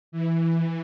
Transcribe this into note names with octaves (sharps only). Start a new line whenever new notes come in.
E3